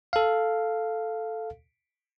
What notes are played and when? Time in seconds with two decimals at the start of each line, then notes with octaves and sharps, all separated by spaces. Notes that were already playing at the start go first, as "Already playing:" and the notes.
0.13 A4 F5